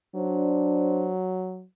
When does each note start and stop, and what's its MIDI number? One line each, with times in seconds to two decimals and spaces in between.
0.15 1.65 54
0.15 1.11 62
0.15 1.11 72